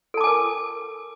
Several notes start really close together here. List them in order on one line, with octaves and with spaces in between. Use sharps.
A4 A5 D6 G#5 A#4